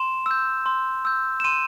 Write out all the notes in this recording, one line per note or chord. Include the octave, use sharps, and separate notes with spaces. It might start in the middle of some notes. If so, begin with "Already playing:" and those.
Already playing: C6 E7
E6 G6
C6
E6 G6
E7
C6 D#7